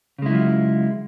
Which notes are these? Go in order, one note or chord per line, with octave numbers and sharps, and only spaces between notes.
C#3 F#3 G#3 E4 F4